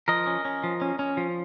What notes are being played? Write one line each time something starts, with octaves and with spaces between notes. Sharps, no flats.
F3 A#4 D#5
C#4
C#4
F3
C#4
C#4
F3